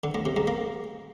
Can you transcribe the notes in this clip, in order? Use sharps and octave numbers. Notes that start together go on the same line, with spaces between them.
D3
A2
C3
G#2
A#3